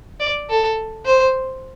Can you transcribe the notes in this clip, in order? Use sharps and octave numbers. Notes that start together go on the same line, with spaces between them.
D5
A4
C5